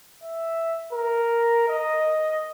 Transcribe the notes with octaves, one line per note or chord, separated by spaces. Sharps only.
E5
A#4
D#5